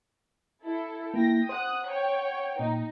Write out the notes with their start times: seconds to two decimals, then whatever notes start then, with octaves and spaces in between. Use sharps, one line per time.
0.65 E4 A4
1.14 A#3 E4 G5 A#6
1.49 C5 F#5 D#6 F#6
1.88 C#5 G5
2.59 A#2 D#4